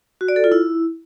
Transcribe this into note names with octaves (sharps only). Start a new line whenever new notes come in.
F#4
D5
A4
F4
E4